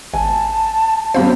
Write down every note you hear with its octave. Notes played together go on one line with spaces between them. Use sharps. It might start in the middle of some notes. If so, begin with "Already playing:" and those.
G#1 G#5 A5
F#2 B2 C4 C5 F5 B5